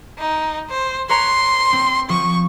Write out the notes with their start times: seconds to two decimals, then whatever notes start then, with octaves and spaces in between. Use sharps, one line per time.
0.18 D#4
0.70 C5
1.09 B4 C#5 A#5 C6
1.73 C4
2.09 F3 C#6